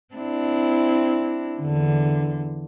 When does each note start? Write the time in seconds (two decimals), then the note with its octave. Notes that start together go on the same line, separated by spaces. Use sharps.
0.14 C4 D4 E4
1.60 E2 D3